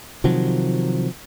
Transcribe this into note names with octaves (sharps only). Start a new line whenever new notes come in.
C3 D#3 F3 F#3